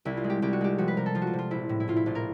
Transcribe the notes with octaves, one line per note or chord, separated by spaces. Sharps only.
C2 E4
F4
G#3
G4
C2 G4
F#4
G#3 G4
F3 F#4
B4
C3 A#4
A4
F3 F4
F#4
F4
C3
F4
A#1 E4
A2
E4
A2 F4
E4
A#1 F4
A#4